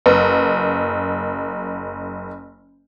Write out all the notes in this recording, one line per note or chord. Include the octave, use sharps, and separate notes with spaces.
F#1 B4